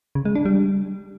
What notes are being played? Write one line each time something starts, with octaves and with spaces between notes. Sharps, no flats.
C#3
G#3
D4
G3